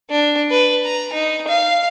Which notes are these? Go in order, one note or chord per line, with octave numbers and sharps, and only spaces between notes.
D4
B4
A#5
D#4
F5